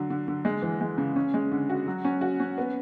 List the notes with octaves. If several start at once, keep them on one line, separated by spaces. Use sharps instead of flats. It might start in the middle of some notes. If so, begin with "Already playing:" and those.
Already playing: D3 F#3
D3
D3
G#3
E3
G#3
C#3
C#4
G#3
D3
F#4
F#3
C#4
F#4
C#4
B3